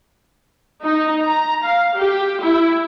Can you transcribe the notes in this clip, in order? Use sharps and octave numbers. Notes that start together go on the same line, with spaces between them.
D#4
A#5
F5
G4
E4